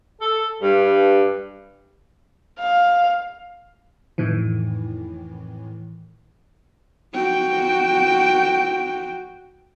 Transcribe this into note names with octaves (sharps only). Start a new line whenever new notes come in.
A4
G2
F5
F2 A2 D#3 E3
F#4 G5